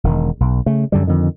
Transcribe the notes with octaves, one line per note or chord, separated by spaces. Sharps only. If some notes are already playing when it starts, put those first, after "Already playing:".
E1 D#3
B1
C#3 A3
F#2 D3 G3
F2 D3 D#3